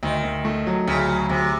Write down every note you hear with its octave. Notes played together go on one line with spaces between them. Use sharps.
D2 D#3
D2
A3
F#3
D2 C#3
F#3
D2 C3